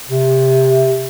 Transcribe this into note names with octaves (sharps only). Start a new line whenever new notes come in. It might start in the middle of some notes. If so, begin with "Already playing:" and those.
C3